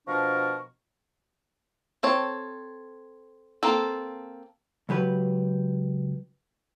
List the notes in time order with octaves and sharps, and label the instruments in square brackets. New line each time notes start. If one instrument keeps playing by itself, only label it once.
[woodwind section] B2 F3 D4 A#4 C#6
[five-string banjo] C4 A4 C#5
A#3 C4 A4
[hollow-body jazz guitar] C#2 F#3 G4 B4